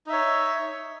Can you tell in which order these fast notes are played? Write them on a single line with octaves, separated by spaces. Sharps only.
D#4 E5 C#5